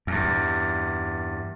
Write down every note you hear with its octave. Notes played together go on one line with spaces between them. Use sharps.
E2 G2